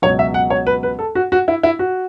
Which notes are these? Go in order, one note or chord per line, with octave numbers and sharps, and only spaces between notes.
C#2 B2 F#3 C#5
E5
F#5
C#5
B4
B4
A4
F#4
F#4
E4
E4
F#4